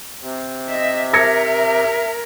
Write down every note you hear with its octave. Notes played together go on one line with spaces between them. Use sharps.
C3
D#5 E5
A#4 E5 G#6 A#6 C#7